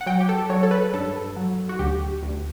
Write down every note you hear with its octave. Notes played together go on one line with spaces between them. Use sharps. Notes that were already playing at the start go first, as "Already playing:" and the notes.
F#5
F#3 G5
G4
A4
F#3 C#5
A4
B4
G2 A4
F#3
F#4
D2 G4
D2